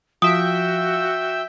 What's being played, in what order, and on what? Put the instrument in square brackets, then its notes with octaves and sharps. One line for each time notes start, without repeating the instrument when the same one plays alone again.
[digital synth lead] F3 [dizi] F#4 [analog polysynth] E5 G5 [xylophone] D#6